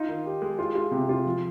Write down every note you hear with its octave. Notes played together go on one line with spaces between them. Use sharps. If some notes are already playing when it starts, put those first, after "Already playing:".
Already playing: D#4 F4
D#3
G4
G#3
F4
F4
C3
F4
F3